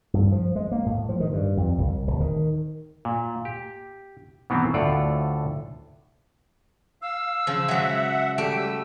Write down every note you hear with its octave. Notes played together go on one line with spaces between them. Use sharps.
G2
F3
G#3
A#3
A2
F3
D#3
G2
F2
C2
D1
D#3
A#2
G4
B2 D#3 E3 F#3 B3 C4
D2 A2 D3 F4 A4 D5
F5 E6
C#3 F3
F#3 G#3 E5 F#5
G3 A3 G4 D7
E6